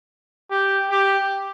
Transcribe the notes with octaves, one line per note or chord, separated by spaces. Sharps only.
G4
G4